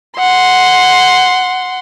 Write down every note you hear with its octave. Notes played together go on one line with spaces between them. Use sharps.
F#5 C6